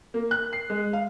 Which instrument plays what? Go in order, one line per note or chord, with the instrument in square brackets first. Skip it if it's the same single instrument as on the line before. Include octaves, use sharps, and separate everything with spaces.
[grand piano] A#3
F#6
C7
G#3
F5